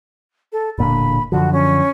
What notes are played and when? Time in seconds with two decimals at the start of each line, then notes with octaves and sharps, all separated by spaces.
0.52 A4
0.78 E1 A#2 D3 B5
1.32 F#2 D3 F3 F#4
1.53 C#4